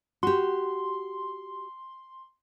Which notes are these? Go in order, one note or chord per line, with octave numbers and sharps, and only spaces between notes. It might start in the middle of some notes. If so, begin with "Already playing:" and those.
F#4 G4 C6